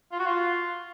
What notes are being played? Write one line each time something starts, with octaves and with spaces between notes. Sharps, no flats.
F4
F#4
F4